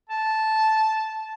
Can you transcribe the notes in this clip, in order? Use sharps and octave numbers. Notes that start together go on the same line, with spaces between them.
A5